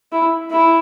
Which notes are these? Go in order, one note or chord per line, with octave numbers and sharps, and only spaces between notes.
E4
E4